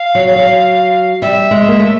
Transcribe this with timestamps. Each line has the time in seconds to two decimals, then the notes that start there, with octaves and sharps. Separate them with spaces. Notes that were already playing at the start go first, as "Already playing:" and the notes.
Already playing: F5
0.15 F#3
0.36 F#3
1.22 G3 E5
1.51 G#3
1.68 A#3
1.80 A3